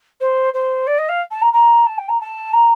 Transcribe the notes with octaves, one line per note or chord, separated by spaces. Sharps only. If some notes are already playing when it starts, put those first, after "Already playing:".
C5
C5
D5
D#5
F5
A5
A#5
A#5
A5
G5
A#5
A5
A#5